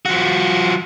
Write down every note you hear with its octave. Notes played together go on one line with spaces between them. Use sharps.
F3 F#4